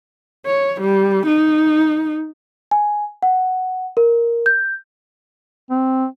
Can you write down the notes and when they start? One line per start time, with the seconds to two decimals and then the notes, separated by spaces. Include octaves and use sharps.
0.46 C#5
0.81 G3
1.26 D#4
2.71 G#5
3.23 F#5
3.97 A#4
4.46 G6
5.71 C4